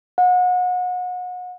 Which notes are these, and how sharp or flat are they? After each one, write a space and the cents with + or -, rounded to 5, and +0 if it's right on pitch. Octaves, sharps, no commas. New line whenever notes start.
F#5 -35